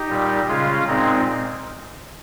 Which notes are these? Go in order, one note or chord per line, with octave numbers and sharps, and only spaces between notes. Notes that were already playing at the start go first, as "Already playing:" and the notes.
Already playing: D#4 G4
A#2 G3
C#3 G#3 C#4 F4
A#2 G#3 C4 D#4